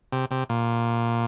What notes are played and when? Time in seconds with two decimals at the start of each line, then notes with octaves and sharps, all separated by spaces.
0.12 C3
0.31 C3
0.49 A#2